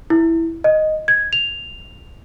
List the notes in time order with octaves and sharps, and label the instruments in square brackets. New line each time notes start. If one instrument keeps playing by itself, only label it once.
[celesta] E4
D#5
G#6
F7